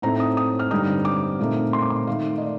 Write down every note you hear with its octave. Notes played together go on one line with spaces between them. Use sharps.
A2 A3 C4 D#4 A#5
D#6
D#6
F6
G2 D3 G3 C4 D#4 D#6
D6
A#2 A3 C4 D#4
C6
D6
C6
D#3 A3 D#4 F5
D#5
D5